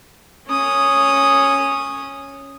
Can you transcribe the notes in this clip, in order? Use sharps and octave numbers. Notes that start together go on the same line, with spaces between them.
C#4 D#6